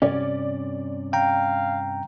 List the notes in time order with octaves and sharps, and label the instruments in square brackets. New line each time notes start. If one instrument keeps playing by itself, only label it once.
[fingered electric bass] G2 C3 C#4 [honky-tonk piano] D5
[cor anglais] F5 [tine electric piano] G5 A#5